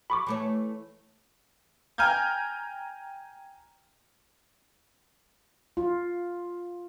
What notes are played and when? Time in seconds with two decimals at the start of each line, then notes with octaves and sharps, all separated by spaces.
0.10 B5 C#6 D6
0.27 E3 A3 C#5
1.98 G5 G#5 A#5 F6 G6 G#6
5.77 F4